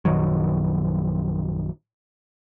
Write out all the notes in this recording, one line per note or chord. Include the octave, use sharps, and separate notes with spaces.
A#1 F#2 D#3 F#3